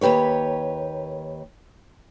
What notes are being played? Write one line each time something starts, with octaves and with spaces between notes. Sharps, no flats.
D#2 C#3 G4 B4 C#5